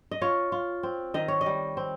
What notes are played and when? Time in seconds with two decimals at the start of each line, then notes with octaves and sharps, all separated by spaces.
0.11 D#5
0.21 F4 C#5
0.52 F4
0.83 C4
1.14 D#3 D#5
1.28 C#5
1.41 D#5
1.46 G3
1.77 C4